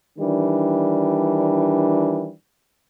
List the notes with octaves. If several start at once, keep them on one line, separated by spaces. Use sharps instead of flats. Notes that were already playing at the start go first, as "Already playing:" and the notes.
D#3 E3 G3 D4